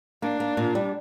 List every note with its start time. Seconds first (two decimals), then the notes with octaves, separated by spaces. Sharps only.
0.22 A#3 D4
0.40 A#3
0.57 A#2
0.75 G3